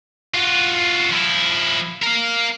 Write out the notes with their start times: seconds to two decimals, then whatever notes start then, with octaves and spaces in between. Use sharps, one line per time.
0.34 F4 F#4
1.11 F3 E4
2.02 A#4 F5